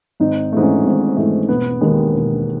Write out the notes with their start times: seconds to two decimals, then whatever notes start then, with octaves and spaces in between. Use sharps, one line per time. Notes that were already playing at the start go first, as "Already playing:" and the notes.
0.20 G#1 D#4
0.52 G#2 E3 A3
0.63 C#4
0.85 G#1
1.17 G#2 E3 A3
1.48 E1 B3
1.81 D#2 D#3 G#3
2.13 E1